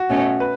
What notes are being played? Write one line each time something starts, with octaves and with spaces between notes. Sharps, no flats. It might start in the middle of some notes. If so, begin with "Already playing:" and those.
Already playing: F#4
B2 A3 C#4
B4